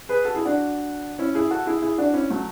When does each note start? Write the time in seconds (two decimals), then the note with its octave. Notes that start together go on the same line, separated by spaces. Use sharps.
0.09 G#4 B4
0.25 F#4 A4
0.35 E4 G#4
0.45 D4 F#4
1.19 C#4 E4
1.35 E4 G#4
1.51 F#4 A4
1.66 E4 G#4
1.82 E4 G#4
1.98 D4 F#4
2.14 C#4 E4
2.30 F#3 A3